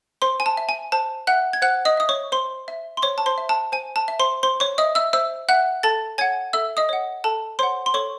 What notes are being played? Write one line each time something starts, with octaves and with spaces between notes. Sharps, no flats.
C5 C6
G#5
A5
E5
G#5
C5 A5
E5 F#5 F#6
G#6
C5 F#5 F#6
D#5 D#6
E5 D#6
C#5 C#6
C5 C6
E5
C6
C5 C#5 C#6
A5
C5 C6
E5
A5
C5 G#5
A5
E5
C5 C6
C5 C6
C#5 C#6
D#5 E5 D#6
E5 E6
C5 E5 E6
E5 F#5 F#6
A4 A5 A6
C#5 F#5 G#5 G#6
A4 E5 E6
D#5 D#6
C#5 F#5
A4 A5
C5 C#5 F#5 C6
C6
A4 C#5 C#6